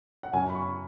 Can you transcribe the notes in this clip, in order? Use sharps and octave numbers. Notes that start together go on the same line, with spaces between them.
F#5
F#2 G#5
B5
C#6